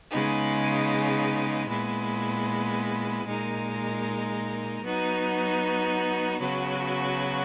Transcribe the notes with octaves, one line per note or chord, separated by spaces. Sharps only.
C#3 G#3 B3 D#4
A#2 G#3 B3 E4
A#2 G#3 D#4 A#4
F#3 B3 D#4 F#4
C#3 F#3 B3 F#4